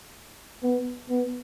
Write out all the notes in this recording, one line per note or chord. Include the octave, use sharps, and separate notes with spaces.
B3
B3